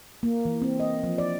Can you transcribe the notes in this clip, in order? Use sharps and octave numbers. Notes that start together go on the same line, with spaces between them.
A#3
E3
C4
D#5
F3
D5